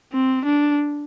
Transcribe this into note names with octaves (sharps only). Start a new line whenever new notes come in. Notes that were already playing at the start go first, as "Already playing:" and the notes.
C4
D4